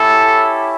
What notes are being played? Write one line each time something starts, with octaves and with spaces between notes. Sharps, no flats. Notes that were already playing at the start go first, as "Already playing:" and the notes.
Already playing: C#4 E4 G4 A4